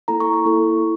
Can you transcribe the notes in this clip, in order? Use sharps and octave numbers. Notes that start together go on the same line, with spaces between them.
A#3 E4 A4 A#5
C#6
C#6
A#3 E4 A4